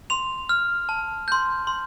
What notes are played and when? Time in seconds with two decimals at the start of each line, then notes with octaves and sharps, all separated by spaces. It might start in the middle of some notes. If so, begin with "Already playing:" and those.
0.10 C6 F7
0.49 F6
0.89 A5
1.28 C6 G6
1.67 C6